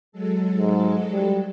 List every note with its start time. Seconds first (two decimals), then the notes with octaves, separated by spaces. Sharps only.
0.12 F#3 G#3 A4
0.58 G#2
1.13 G3